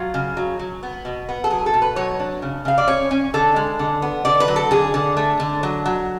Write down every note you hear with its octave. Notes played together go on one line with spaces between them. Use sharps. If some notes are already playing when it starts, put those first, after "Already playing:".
Already playing: F#3 F4
C#3
F#3
F#3
B3
B2
B3
A4
F#3 G#4
A4
B2
B4
F#3 C#5
D4
C#3
C#3 F5
D5
C#4 C#5
C#4
D3 A4
G#3
D3
B3
D3 D5
B4
F#3
A4
D3 G#4
D3
A3
D3
F#3
F#3